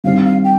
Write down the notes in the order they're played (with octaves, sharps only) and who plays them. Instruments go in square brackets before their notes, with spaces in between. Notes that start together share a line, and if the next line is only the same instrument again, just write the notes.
[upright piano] G2 D#3 G3 C4 [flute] F5
[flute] F5
G5